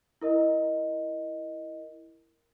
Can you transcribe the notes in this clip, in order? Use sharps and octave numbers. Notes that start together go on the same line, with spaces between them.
E4 A#4 D#5